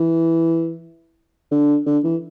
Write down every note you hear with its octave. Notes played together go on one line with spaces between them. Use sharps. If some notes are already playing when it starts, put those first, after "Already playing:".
Already playing: E3
D3
D3
E3